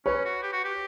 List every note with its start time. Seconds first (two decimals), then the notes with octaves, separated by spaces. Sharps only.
0.06 C#4 B4 C#5
0.25 F#4
0.43 G4
0.53 F#4
0.64 G4